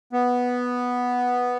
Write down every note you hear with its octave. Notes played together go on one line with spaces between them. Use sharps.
B3